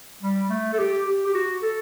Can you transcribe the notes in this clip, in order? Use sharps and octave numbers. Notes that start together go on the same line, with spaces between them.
G3
A3
A4
G4
G4
G4
F#4
A4